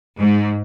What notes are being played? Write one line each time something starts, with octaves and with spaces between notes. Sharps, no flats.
G#2